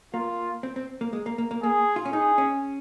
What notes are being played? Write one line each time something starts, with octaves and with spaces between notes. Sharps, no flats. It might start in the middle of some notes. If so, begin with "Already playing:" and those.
A#3 F4
C4
C4
A#3
G#3
A#3
A#3
A#3
A#3 G#4
F4
C#4
D#4 G#4
C#4